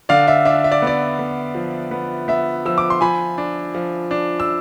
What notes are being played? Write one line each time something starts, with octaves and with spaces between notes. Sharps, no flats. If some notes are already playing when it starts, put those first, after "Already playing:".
D3 D5 F5
E5
D4 E5
E5
D5
B3 D5
B3
F3
B3
B3 E5
F3 E6
D6
C6
F3 G#5 B5
D4
F3
D4
E6